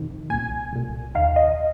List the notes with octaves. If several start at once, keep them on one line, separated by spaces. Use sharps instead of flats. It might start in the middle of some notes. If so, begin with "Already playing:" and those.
Already playing: F2 C3 D#3
C2 A#2 G#5
C2 A#2
D#2 D#3 F5
D#5